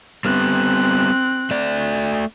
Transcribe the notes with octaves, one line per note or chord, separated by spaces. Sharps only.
G3 B3 C4 F#6
A3 D5